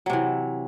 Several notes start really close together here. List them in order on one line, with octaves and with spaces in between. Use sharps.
F#3 C3 E3